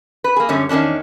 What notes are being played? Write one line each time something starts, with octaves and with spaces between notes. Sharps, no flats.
B4
A#3 G#4
F#2 D3 G3 C#4
E2 D#3 G#3 C#4 D4